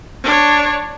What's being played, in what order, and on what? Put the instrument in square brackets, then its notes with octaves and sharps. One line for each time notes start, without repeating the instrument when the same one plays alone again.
[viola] D4 C#5